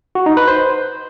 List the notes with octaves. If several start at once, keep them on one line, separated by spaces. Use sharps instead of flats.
F#4
D#4
B4
C5